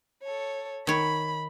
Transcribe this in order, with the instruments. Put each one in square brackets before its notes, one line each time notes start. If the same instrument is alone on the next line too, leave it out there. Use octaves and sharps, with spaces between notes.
[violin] A4 C#5
[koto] D#3 C#5 [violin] B5